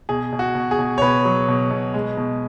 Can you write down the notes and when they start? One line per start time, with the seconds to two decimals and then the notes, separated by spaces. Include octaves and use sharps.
0.09 B2 G#4
0.33 B2
0.39 F#4
0.55 B2
0.71 G#4
0.79 B2
0.98 C#5
1.01 B2 B4
1.25 F#3
1.48 B2
1.71 B2
1.94 G#3
2.17 B2